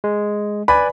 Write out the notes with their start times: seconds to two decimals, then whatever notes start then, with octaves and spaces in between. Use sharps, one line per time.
0.04 G#3
0.68 B4 D5 G#5 B5